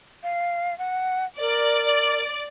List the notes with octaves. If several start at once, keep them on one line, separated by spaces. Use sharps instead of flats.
F5
F#5
A#4 D5